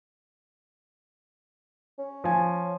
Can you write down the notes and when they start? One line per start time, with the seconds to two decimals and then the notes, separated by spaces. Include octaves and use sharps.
1.98 C#4
2.24 F3 G#5